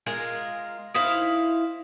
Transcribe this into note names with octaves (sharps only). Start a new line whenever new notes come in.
G#3 F4 A#4
D#4 E4 C5 F5